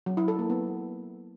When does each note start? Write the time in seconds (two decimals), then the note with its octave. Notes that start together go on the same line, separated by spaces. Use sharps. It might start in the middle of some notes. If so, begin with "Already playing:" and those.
0.06 F#3
0.17 E4
0.28 A4
0.39 A#3
0.50 B3